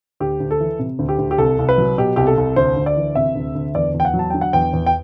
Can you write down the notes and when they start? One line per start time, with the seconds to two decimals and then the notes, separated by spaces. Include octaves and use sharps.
0.20 D2 G4
0.40 D2
0.51 A4
0.60 E3
0.79 C3
0.99 D2
1.09 G4
1.18 D2
1.31 G4
1.38 C2 A4
1.59 C2
1.69 B4
1.78 F#3
1.98 B2 G4
2.16 C2 G4
2.27 A4
2.38 C2
2.56 D2 C5
2.76 D2
2.86 D5
2.97 E3
3.15 C3 E5
3.35 D2
3.55 D2
3.75 E2 D5
3.94 E2
4.00 G5
4.05 F#5
4.14 F#3
4.19 A5
4.30 D3 G5
4.41 F#5
4.53 E2 G5
4.73 E2
4.86 G5